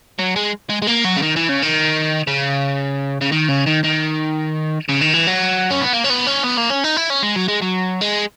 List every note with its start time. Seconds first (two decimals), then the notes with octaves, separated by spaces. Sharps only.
0.19 F#3
0.36 G#3
0.70 G#3
0.82 G#3
0.87 A#3
1.04 F#3
1.16 C#3
1.22 D#3
1.36 E3
1.49 C#3
1.62 D#3
2.27 C#3
3.21 C#3
3.32 D#3
3.49 C#3
3.66 D#3
3.84 D#3
4.89 C#3
5.01 D#3
5.14 E3
5.27 F#3
5.70 C#4
5.81 B3
5.93 A#3
6.05 C#4
6.10 B3
6.27 C#4
6.44 B3
6.58 A#3
6.70 C#4
6.84 D#4
6.97 E4
7.10 C#4
7.23 G#3
7.36 F#3
7.48 G#3
7.62 F#3
8.01 G#3